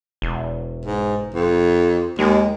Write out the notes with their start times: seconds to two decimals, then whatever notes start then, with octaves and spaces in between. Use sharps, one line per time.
0.22 E1
0.85 G#2
1.35 F2
2.19 D#2 G#3